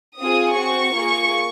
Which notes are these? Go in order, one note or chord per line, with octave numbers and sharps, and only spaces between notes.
C4 F4 G#4 D#6
C4 F#4 C#6
A#3 F4 G#4